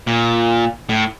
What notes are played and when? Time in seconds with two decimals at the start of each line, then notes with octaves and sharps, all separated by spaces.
0.07 A#2
0.89 A2